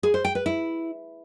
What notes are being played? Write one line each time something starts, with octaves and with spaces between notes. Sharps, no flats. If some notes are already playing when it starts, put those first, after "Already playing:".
G#4
C5
G5
B4
E4